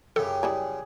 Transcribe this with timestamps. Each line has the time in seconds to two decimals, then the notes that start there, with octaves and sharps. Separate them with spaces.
0.16 F#2 C#3 G4 A4
0.43 G3 E4 G#4 G#5